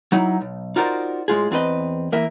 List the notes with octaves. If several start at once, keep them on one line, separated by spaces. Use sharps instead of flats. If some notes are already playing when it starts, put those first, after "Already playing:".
F#3 D#4 E4
B1
D#4 F4 F#4 A#4 C5 D5
A2 G#3 F4 G#4
E2 C4 F4 B4 D#5
E3 A#3 A#4 E5